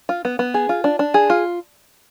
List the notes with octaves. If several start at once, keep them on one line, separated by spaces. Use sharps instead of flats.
F4
B3
B3
G#4
F4
D4
D4
G#4
F4